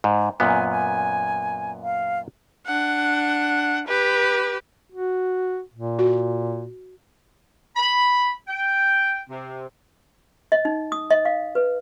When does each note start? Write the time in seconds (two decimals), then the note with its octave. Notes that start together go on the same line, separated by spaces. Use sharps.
0.04 G#2
0.40 F#2 A#2 B3 G#5
0.70 G#5
1.83 F5
2.66 D4 F#5
3.87 G4 B4
4.92 F#4
5.74 A#2
5.99 F#4
7.76 B5
8.48 G5
9.29 C3
10.52 D#5
10.65 D#4
10.92 D#6
11.10 D#5
11.25 F5
11.55 B4